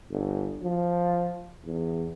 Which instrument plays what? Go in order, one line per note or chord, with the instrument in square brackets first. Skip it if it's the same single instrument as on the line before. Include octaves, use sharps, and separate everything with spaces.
[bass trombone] G1
F3
E2